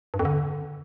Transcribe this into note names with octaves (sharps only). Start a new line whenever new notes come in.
G2
F2
D3